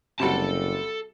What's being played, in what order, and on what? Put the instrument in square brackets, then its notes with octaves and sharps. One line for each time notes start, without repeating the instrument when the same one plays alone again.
[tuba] F#1 [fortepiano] C3 G3 F#4 [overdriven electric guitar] A4 A5